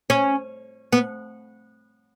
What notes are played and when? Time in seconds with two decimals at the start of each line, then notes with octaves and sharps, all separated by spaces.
0.10 C#4
0.92 B3